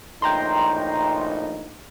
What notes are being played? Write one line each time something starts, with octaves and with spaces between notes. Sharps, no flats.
A#1 A2 D#4 G5 A#5 C6